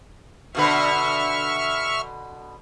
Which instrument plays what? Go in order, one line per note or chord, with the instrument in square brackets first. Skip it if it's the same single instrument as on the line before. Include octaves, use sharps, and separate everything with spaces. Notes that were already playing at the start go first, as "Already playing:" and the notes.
[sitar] B2 D3 B4 [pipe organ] E5 C#6 F6